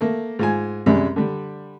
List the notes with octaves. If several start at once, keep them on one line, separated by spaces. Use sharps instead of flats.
A3 A#3
G#2 F4 G#5
C2 F#2 G3 G#3
D3 G3